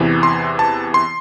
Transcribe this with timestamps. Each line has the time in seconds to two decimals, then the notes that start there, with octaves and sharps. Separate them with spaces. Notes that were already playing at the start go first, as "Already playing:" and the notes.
Already playing: E2 C3 E3
0.23 C6
0.59 A5
0.94 C6